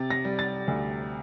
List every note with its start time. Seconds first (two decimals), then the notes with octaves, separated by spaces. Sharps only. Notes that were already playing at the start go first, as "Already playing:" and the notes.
Already playing: C3 A6
0.10 A#6
0.25 G3
0.39 A6
0.68 D2